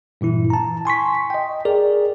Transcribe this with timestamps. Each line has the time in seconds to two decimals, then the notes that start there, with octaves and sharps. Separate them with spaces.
0.21 G2 A#2 E3 E4
0.50 A5 A#5
0.85 G#5 C6 C#6 B6
1.30 D#5 G5
1.65 G#4 A#4 D5